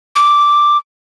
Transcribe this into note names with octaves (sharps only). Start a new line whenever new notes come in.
D6